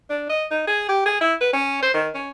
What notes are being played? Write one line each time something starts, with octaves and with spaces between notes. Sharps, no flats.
D4
D#5
D#4
G#4
G4
G#4
E4
B4
C#4
C5
D#3
C#4